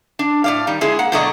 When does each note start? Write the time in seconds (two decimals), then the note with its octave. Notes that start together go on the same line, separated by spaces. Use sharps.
0.19 D4
0.44 A2 D5 F5
0.67 D#3 G3
0.81 D3 G#3 E4 G#4
0.99 A#3 F#5
1.12 B2 D3 F#3 A3 D5 D#5